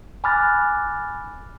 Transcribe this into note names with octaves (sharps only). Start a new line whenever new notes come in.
G#5 B5 D6 F6 F#6 A6